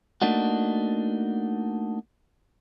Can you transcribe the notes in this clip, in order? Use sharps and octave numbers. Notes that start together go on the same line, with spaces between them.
A3 A#3 D4 D#4 F#4